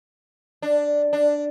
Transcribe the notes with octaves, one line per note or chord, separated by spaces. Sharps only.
D4
D4